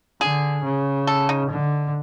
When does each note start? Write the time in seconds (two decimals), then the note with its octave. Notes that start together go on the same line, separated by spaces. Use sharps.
0.21 D3 G#4
0.65 C#3
1.07 A4
1.29 D#4
1.50 D3